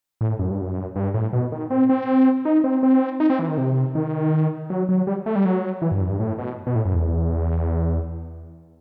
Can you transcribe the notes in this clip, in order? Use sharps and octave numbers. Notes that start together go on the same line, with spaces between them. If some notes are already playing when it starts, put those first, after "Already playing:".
A2
F#2
G2
F#2
G2
A2
B2
D#3
C4
C4
D#4
C4
C4
D#4
C4
E3
D#3
C3
D#3
F#3
F#3
G3
A3
G3
F#3
E3
G2
F#2
G2
A2
B2
B2
A2
F#2
E2